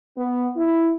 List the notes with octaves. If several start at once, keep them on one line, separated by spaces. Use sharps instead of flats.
B3
E4